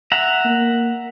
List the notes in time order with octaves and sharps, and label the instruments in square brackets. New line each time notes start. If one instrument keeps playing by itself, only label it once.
[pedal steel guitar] E5 F#5 A#5
[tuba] A#3